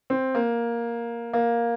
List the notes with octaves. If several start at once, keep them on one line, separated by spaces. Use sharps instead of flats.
C4
A#3
A#3